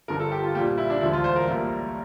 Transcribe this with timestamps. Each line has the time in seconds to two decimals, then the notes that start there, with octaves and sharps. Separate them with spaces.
0.08 G1 G2 D3 F3 A#4
0.20 A4
0.32 G4
0.43 F4
0.55 A#1 A#2 G3 A#3 G4
0.78 E4
0.90 D4
1.01 E1 D2 D3 F3 E4
1.13 F4
1.24 C5
1.36 A#4
1.48 A#1 A2 G3 A#3